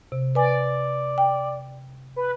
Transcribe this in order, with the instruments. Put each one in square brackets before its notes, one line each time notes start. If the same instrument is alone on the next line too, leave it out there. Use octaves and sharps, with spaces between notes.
[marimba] C3
[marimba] B4 G#5 [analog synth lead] D5
[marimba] G5
[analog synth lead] B4